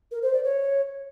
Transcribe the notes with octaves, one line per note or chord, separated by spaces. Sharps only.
A#4
C5
D5
C#5